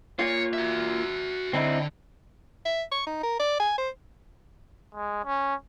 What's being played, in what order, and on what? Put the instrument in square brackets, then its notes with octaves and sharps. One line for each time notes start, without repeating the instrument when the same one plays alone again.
[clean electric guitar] A#3 F4 [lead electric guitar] C#5
[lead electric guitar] F#4 E5
[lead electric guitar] D3 [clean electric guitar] C4 D#4 E4
[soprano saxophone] E5
C#6
D#4
A#4
D5
G#5
C5
[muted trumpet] G#3
C#4